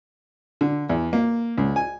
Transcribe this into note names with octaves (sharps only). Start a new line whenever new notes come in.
D3
E2
A#3
C#2
G#5